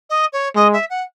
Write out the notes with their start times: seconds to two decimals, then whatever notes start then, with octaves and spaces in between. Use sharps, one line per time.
0.10 D#5
0.33 C#5
0.55 G#3 D#5
0.73 E5
0.90 F#5